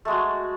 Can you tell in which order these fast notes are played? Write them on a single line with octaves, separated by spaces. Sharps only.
A3 G#3 F#4